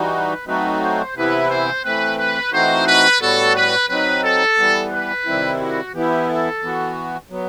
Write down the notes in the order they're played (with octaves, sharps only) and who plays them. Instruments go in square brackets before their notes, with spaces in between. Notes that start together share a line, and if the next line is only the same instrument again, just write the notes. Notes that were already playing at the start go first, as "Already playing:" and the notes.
Already playing: [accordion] E3 G3 D#4 F#4
[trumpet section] B4
[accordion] F#3 A3 C4 D#4 F#4 [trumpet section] B4
[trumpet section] C5
[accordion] C3 E3 B3 E4 [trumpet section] B4
[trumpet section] C5
[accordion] E3 A3 C4 [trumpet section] B4
[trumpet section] B4
[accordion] E3 A3 C4 D#4 F#4 [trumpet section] C5
[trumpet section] B4
[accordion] A2 G3 B3 F#4 [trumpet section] A4
[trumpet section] B4
[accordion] F#3 C4 D#4 [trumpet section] B4
[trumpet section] A4
[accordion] E3 G3 B3
[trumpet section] B4
[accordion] C3 D#3 G3 C4 E4
[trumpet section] F#4
[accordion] E3 B3 E4 [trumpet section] G4
[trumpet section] A4
[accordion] E3 B3 F#4
F#3 B3